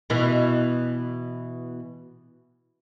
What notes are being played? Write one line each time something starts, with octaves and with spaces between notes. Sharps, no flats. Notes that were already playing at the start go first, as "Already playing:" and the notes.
B2 E3